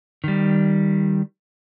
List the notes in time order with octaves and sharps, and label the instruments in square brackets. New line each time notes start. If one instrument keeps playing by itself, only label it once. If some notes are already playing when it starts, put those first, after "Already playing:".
[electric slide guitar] D#3 G3